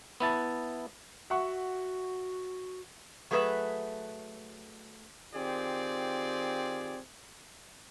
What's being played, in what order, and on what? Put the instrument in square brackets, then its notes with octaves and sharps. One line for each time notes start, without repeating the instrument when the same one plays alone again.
[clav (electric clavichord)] B3 E4 A5
[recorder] F#4 [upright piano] E5 F#5 C#6
[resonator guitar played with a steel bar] F#3 A3 G#4 A#4 B4 E5
[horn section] D#3 C4 F4 G4 G#4 D5